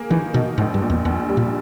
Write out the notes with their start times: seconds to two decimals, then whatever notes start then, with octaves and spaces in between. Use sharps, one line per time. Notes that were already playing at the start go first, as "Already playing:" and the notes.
Already playing: A#3 G#4
0.10 D#3 E3
0.34 B2 D#4
0.58 A#1 G#2
0.74 G2
0.82 A#2
0.90 E2
1.05 A#1 E2
1.29 G3
1.37 A#2